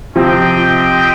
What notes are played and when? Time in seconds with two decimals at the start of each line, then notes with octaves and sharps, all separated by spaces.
0.15 C3 F3 C4 G4 D#5 G5